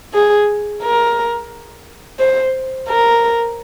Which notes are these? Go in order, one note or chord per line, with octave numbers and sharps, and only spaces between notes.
G#4
A#4
C5
A#4